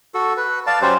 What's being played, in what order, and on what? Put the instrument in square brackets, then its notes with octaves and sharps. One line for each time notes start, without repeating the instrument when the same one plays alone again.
[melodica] F#4 A4
B4
D5 F5 A5
F#3 C#4 G4 C5